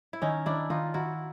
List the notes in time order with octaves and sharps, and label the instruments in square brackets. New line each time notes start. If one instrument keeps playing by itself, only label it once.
[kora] E4
[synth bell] D#3 [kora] C#4 D#4
[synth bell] D#3 [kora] D4 E4
[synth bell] D#3 [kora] D#4 F4
[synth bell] D#3 [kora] E4 F#4